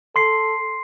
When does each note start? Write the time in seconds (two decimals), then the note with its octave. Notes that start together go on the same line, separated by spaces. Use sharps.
0.16 A4 C6 C7